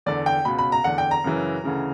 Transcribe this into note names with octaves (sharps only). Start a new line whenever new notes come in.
E2 D3 D5
G5
C#2 B2 B5
B5
A#5
E2 D3 F#5
G5
A#5
F#2 C#3 E3
D2 C#3 E3